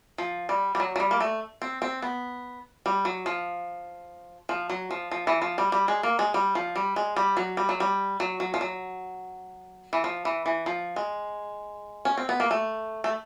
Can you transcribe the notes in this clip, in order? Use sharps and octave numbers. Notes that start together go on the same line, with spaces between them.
F3
G3
G3
F#3
F#3
G3
A#3
A3
C4
C4
B3
G3
F#3
F3
F3
F#3
F3
F3
E3
F3
G3
G3
G#3
A#3
G#3
G3
F3
G3
G#3
G3
F#3
G3
F#3
G3
F#3
F#3
F3
F#3
E3
F3
E3
E3
F3
G#3
C#4
C4
B3
A#3
A3
A3